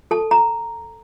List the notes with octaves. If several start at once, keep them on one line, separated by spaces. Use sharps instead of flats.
A4 A5
A#5